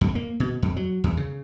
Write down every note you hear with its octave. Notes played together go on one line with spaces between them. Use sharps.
F2
A#3
B2
F2
F#3
E2
C#3